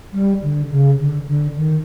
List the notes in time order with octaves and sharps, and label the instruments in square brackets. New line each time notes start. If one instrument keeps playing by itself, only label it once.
[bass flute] G3
D3
C#3
D3
D3
D#3